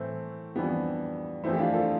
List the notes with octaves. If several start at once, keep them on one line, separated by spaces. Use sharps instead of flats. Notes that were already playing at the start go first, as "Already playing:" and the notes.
Already playing: A2 E3 A3 C4
F2 E3 G3 B3 D4
F2 E3 A3 C4 E4
G4
D4 F4
F4 A4